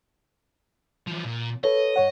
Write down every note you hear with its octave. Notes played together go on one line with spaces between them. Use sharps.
E3 F3
A#2
A4 B4 C#5 D#5
G2 C#5 F#5